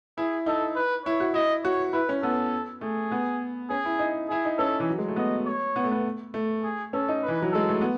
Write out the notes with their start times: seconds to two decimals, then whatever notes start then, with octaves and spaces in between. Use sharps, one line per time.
0.18 E4 G#4
0.46 D#4 A4
0.76 B4
1.05 E4 C#5
1.20 F#4
1.34 E4 D#5
1.64 F#4 C#5
1.93 E4 B4
2.09 C#4
2.23 B3 A4
2.81 A3 G#4
3.11 B3
3.70 C#4 G#4
3.85 E4
3.99 D#4
4.29 E4 G#4
4.45 D#4
4.58 C#4 A4
4.80 E3
4.90 F#3
4.98 G#3
5.08 A3
5.16 B3 D#5
5.46 C#5
5.76 B3
5.84 A3
5.91 B3
6.34 A3
6.63 G#4
6.93 C#4 A4
7.09 D#4
7.23 B4
7.28 E3
7.42 F#3
7.52 G#3 A4
7.69 A3
7.81 B3